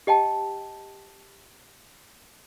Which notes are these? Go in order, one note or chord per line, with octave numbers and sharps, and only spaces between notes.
G4 D#5 G5 A5